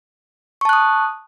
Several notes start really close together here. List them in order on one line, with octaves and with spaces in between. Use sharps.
C#6 A5 F#6 D#6